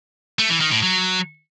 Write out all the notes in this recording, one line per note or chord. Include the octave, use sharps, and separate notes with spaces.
A3
E3
D#3
A2
F#3